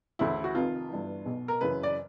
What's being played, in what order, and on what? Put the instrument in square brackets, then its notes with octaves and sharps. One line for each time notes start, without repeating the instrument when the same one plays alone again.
[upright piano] D2 C#3 E3 E4
F#4
F1 F2 C3 D#3 F4
G1 G2 E3
B1 B2
A#4
F#1 F#2 C#3 E3 B4
D5